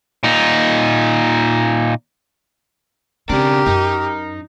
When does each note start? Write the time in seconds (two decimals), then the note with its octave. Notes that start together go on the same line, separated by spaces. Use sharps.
0.23 A#2 D#4
3.29 C#3 C4 D4 G4 A#4
3.66 F#2 D#4